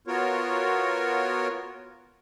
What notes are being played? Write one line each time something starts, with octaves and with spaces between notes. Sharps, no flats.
B3 F4 F#4 A#4 C#5